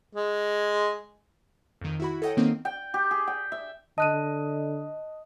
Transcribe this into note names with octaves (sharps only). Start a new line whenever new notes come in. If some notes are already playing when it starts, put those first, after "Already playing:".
G#3
F2 D#3
E4 F#4 B5
A4 C#5 D#5 F#5 G5
D#3 A#3 C4 D#4
G5
G4
G#4
G5
E5
D3 D#5 A5 F#6 D#7